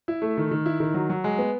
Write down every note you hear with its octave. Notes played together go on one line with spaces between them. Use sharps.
E4
A3
D#3
D#3
E4
D#3
F#3
F#3
G#3
B3